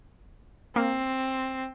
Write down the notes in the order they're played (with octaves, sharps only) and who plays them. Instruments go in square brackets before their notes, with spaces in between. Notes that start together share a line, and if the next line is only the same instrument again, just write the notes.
[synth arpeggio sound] A#3 [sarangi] C4